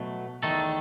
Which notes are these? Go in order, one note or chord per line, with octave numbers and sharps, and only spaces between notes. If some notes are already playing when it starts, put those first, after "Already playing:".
Already playing: B2 F#3 A3
E2 D#3 A3 A4